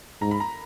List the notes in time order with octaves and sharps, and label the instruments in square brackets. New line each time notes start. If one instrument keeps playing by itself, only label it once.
[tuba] G#2 [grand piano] A#5
[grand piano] B5
A#5